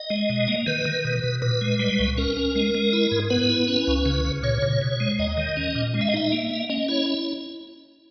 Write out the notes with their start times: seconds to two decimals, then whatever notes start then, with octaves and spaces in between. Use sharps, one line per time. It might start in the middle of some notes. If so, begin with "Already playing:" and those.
Already playing: D#5
0.10 G#3
0.29 B2
0.48 A#3
0.66 D#3 B4
0.85 D#3
1.05 B2
1.24 B2
1.42 A#2 B4
1.61 G#3
1.79 G3
1.99 C#2
2.18 C#4 A#4
2.37 C#4
2.56 G#3
2.75 G#3
2.93 E4
3.12 G#2
3.30 B3 B4
3.50 E4
3.68 C#4
3.87 C#2
4.06 C#3
4.25 C#3
4.43 A#2 C#5
4.62 A#2
4.81 B2
5.00 G#3
5.19 D#2 D#5
5.37 D#3
5.57 C#4
5.75 A#2
5.94 G#3
6.01 E5
6.09 D#5
6.14 D#4 E5
6.32 A#3
6.51 A#3
6.70 C#4 D#5
6.88 E4 C#5